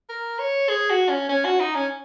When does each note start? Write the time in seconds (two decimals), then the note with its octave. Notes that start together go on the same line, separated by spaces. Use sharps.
0.09 A#4
0.39 C#5
0.69 G#4
0.90 F#4
1.09 C#4
1.29 C#4
1.45 F#4
1.60 D#4
1.75 C#4